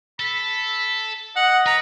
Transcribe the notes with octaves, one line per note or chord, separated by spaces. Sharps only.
A4 B5
D#5 F#5
B4 A#5